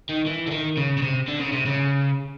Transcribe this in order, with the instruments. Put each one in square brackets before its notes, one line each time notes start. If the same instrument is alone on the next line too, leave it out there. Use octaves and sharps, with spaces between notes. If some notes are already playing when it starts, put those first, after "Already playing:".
[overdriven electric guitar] D#3
E3
D3
D#3
C#3
C#3
C3
D3
C#3
C3
C#3